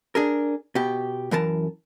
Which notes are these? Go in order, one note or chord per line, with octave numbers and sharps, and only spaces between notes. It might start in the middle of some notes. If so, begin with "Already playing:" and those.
D4 G#4 A#4
B2 G4
F#2 E3 A#4 A5